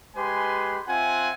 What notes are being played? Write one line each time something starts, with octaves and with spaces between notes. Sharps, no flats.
G#3 G4 B4 G#5 C6
C4 F4 E5 F#5 G#5